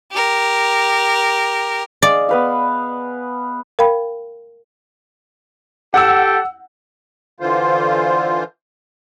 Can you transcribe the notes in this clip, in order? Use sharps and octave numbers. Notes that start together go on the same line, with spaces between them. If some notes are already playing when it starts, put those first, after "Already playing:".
G4 A#4
G#4 D5 D#5 F5
B3 B4 F5
A#4 F5 G5 B5
G4 A4 F#5 E6
D3 E3 F4 C5